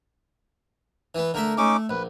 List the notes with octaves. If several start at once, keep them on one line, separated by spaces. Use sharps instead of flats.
E3 B3
D3 A3 A#4 E5
A3 C#4 D#4 D6
A#1 B4